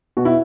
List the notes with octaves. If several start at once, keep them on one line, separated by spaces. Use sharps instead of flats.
B2 F#4
E4